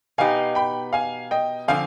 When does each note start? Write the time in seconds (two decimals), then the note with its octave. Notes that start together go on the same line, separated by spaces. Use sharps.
0.18 B2 B3 D#4 G4 F5 G#5
0.55 G5 B5
0.93 F5 G#5
1.31 D#5 G5
1.68 D3 F3 C4 F5 G#5